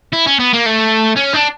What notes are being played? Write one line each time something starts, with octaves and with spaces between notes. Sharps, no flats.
E4
C#4
B3
A#3
A3
C#4
D4